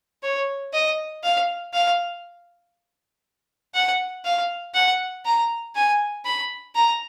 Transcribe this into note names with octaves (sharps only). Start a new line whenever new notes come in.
C#5
D#5
F5
F5
F#5
F5
F#5
A#5
G#5
B5
A#5